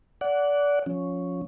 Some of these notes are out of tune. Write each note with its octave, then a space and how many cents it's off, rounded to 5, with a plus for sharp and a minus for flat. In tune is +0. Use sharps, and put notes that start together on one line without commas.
D5 -25 F#5 +0
F3 +25 C#4 +0